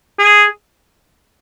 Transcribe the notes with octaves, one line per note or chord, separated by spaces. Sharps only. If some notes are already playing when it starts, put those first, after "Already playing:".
G#4